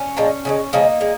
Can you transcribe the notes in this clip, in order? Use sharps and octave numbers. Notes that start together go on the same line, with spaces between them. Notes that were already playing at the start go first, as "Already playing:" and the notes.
Already playing: C#4
A#2 F3 G#3
C#3 F3 G#3
C#3 F3 G#3 A#3 D#4
G#3